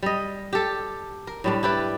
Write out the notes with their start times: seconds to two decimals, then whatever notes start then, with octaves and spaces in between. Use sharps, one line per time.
0.03 G3 D#5
0.53 G4 A4
1.27 A#4
1.44 A2 G3 D4
1.63 E4 G4 B4 D5